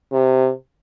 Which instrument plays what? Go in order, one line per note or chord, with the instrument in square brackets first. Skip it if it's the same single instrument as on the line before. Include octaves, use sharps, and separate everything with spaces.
[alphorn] C3